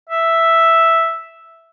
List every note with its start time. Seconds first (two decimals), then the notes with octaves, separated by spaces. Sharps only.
0.09 E5